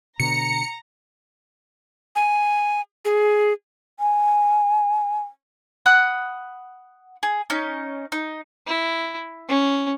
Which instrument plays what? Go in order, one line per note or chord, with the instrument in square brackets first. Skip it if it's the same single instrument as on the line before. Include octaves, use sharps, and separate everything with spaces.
[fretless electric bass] B2 D3 [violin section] A#5 [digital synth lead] C#7
[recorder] G#5
G#4
[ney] G#5
[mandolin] F#5 B5 D#6 F#6
G#4
C#4 D#4
D#4
[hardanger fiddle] E4
C#4